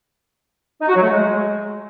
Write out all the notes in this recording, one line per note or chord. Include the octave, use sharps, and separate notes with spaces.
D#4
F#4
F#3
A3
G#3